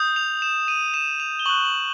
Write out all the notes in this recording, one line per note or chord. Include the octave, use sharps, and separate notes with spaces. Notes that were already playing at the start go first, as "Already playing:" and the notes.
Already playing: D#6 G6
F7
E7
D#7
E7
F7
G7
C#6 F#6 F#7
F#7